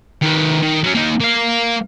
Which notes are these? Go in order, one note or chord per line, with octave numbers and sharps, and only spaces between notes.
D#3 B4
D#3
F#3 C#4
A#3 D#4
A#3 F5